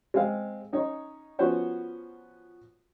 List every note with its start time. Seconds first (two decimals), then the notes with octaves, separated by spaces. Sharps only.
0.14 G#3 C4 F5
0.73 C#4 D#4 C#5
1.39 F3 B3 C#4 F#4 C5 C#5